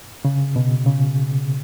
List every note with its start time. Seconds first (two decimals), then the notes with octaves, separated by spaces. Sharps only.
0.25 C#3
0.56 B2
0.86 C#3